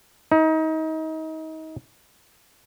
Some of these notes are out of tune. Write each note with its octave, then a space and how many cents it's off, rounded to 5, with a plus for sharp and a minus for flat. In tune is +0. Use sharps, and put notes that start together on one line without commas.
D#4 +30